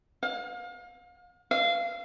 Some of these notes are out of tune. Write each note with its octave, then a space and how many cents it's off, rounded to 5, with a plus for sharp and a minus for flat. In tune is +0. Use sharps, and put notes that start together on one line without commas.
F5 +35
F5 -20